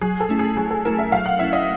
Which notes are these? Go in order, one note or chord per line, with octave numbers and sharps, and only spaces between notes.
F#3 G#4
A4
A3 C#4 E4
G#4
F#3 G#4
A4
A3 C#4 E4 A#4
E5
F#3 F5
F#5
A3 C#4 E4 E5
D#5